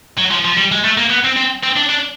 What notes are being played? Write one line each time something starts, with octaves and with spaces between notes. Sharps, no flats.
F#3
F3
F3
G3
G#3
A3
A#3
B3
C4
C4
C4
D4
D4